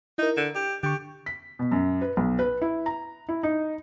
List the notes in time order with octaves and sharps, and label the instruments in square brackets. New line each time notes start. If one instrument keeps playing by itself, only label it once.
[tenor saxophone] D#4 [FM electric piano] E4 A#4
[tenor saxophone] D3
G4
[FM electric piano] D3 C#6 [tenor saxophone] G4
[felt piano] B6
B2
F#2
B4
B1
B4
E4
A#5
E4
D#4